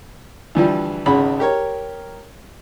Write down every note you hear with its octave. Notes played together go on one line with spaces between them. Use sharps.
D2 E3 F3 G3
G#1 C#2 C#3 F#5 B5
G4 A#4 C#5